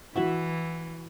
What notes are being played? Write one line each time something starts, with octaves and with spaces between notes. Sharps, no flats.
E3 E4 F#4 E5 F#5